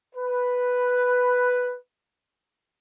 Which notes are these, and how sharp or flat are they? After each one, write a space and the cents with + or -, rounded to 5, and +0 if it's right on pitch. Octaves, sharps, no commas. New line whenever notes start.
B4 +0